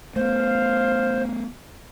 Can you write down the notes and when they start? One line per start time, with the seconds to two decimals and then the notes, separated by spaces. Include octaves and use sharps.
0.16 A3 B3 C5 F5